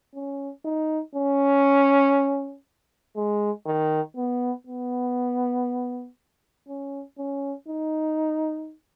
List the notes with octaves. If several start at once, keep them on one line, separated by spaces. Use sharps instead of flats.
C#4
D#4
C#4
G#3
D#3
B3
B3
C#4
C#4
D#4